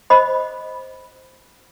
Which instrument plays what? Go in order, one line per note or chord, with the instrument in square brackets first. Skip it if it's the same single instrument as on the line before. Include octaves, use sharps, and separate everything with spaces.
[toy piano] C5 D#5 B5